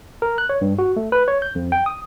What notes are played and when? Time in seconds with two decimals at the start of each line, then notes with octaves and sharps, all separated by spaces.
0.22 A#4
0.38 F#6
0.49 C#5
0.61 G2
0.79 F#4
0.96 A3
1.12 B4
1.28 C#5
1.42 G6
1.55 F2
1.72 G5
1.86 D#6